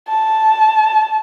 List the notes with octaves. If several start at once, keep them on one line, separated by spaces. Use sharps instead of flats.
A5